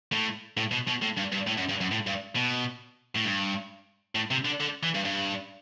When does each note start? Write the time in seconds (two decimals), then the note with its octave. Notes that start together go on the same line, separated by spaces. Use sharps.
0.12 A2
0.57 A2
0.71 B2
0.87 B2
1.02 A2
1.17 G2
1.32 G2
1.47 A2
1.57 F#2
1.69 G2
1.81 F#2
1.91 A2
2.07 G2
2.36 B2
3.16 A2
3.25 G2
4.15 A2
4.31 C3
4.45 D3
4.60 D3
4.83 E3
4.94 G2
5.05 G2